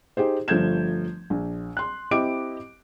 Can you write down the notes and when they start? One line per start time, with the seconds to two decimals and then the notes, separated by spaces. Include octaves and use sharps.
0.17 D#4 G4 G#4 C5
0.48 G1 F3 A3 G6 G#6 E7
1.30 A#1
1.77 C6 F#6
2.11 C4 E4 G4 D#5 D6 D7